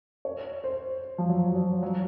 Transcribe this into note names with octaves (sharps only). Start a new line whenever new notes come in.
C#5
C5
F3
F#3
F#3
F#3